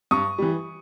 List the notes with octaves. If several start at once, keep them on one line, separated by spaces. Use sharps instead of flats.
G2 C#6 D#6
E3 G3